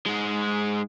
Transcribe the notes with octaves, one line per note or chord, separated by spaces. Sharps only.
G#2 G#3